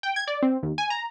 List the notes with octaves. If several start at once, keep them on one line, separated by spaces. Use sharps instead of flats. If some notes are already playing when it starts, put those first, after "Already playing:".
G5
G#6
D5
C4
D#2
G#5
A#5